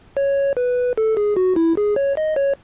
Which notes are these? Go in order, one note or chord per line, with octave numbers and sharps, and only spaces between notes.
C#5
B4
A4
G#4
F#4
E4
G#4
C#5
D#5
C#5